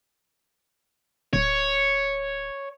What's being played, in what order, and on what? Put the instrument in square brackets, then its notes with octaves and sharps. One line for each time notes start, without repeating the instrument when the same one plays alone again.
[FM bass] D1 [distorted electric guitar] C#5